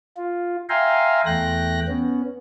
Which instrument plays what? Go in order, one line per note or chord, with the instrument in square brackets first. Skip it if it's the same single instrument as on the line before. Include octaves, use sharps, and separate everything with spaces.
[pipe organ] F4
E5 F5 G5 G#5 A#5 C6
E2 A3 G5 F#6 A#6
B3 C#4